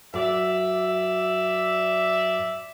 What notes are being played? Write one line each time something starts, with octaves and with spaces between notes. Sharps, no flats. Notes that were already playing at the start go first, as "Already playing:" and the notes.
F#2 D5 E5